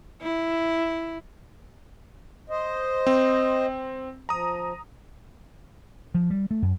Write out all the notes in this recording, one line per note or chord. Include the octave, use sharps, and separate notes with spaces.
E4
C5 D#5
C4
F3 A#5 D#6
F3
G3
A3
F#2